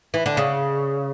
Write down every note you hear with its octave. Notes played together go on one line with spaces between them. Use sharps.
E3
D3
C#3